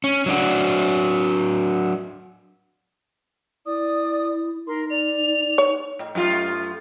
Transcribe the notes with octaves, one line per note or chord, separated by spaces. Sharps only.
C#4
F#3 D4 F#4
E4 D5 D#6
D#4 A#4 C6
D5 F7
C#5
A2
F#2 A3 F4